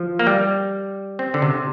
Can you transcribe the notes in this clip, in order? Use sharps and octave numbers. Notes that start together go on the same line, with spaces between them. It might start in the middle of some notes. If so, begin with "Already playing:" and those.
Already playing: F3
A#3
G3
C4
D3
C3